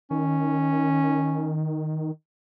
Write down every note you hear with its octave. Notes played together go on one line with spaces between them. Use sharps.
D#3 C#4